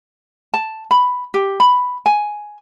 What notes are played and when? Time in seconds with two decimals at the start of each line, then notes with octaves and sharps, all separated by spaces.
0.54 A5
0.91 B5
1.34 G4
1.60 B5
2.06 G#5